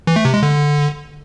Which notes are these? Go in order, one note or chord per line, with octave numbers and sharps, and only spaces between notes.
E3
A3
C3
G#3
D3